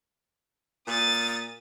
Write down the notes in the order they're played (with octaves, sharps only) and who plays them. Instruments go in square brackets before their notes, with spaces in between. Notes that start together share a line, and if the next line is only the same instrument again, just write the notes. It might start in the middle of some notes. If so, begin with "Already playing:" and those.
[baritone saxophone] A#2 [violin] D#6 A6